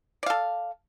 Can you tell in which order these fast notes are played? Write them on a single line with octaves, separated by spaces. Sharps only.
D5 F5 A4